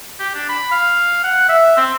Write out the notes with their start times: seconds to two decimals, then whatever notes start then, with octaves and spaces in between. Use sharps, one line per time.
0.20 G4
0.35 D4
0.49 B5
0.72 F5
1.24 F#5
1.49 E5
1.77 C4